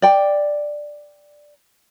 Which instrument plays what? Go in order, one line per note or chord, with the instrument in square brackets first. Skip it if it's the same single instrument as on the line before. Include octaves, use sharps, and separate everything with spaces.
[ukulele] D5 G5